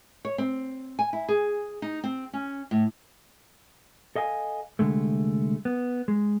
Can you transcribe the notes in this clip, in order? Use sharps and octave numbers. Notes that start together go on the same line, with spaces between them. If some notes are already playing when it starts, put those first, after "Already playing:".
C#5
C4
G#5
E4
G#4
D#4
C4
C#4
A2
A4 D#5 F5 G#5
C2 F2 D3 G#3 A3
B3
G#3